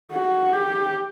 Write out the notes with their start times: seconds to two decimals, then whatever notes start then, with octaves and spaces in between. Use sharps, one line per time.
0.12 F#4
0.53 G4